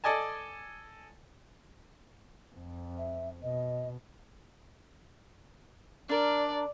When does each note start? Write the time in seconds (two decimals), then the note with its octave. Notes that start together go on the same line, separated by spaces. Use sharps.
0.04 A4 D5 D#5 G#5 A5
2.55 F2
2.98 E5
3.43 B2 D#5
6.09 D4 A#4 D5